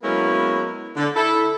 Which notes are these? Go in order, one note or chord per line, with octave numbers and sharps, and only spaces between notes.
F#3 G#3 A#3 B3 C#4 E4
D3
E4 A4